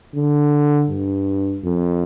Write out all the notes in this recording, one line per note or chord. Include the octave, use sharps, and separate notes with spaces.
D3
G2
F2